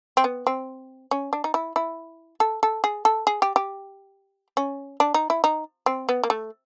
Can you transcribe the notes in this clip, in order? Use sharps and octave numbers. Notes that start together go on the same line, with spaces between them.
C4
B3
C4
C#4
D4
D#4
E4
E4
A4
A4
G#4
A4
G#4
G4
G4
C#4
D4
D#4
E4
D#4
C4
B3
A#3
A3